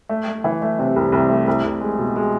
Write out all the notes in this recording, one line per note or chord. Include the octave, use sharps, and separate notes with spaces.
A3
A3
E3
A3
C3
C2
C2
A3
C2
C2
G#3
B2
G#3